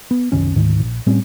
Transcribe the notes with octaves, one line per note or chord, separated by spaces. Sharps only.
B3
F#1 C2 D#3 C#4
D2 G#2 D#3
A#1
A2 G3 C4 C#4